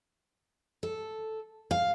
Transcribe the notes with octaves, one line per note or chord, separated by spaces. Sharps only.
A4
F5